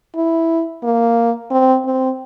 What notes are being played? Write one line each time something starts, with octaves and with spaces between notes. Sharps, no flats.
E4
A#3
C4
C4